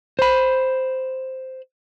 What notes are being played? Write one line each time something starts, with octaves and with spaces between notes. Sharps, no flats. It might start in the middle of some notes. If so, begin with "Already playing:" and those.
C5 B5